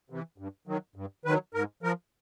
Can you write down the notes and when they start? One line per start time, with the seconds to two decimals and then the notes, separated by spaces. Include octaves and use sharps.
0.10 C3 E3
0.38 G2
0.67 D#3 F#3
0.96 G2
1.25 D#3 F#3 B4
1.54 G#2 A#4
1.83 F3 A#4